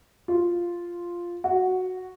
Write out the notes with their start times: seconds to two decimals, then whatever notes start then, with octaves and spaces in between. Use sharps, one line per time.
0.28 F4
1.44 F#4